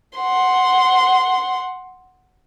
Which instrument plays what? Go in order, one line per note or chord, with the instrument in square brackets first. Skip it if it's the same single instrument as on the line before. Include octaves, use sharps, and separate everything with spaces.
[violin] F#5 C6